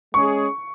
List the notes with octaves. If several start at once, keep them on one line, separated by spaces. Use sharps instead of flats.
G#3 C#4 G#4 C#6